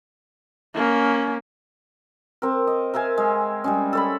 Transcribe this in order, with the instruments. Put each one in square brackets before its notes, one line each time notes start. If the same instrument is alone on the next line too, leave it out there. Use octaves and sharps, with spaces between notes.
[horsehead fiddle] A#3 C#4
[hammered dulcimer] C4 A#4
D#5
A#4 E5 F5 G#5
G#3
G3 G#3 C#4
A4 C#5 B5